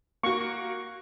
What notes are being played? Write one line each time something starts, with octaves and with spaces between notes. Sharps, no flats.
A#3 F#4 C#6